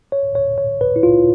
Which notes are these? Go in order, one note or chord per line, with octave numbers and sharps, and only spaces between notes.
C#5
C#5
C#5
B4
E4
F4